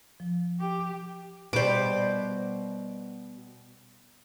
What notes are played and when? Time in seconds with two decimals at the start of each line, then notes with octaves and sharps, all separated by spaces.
0.20 F3
0.60 G4
1.53 B2 G3 C5 D6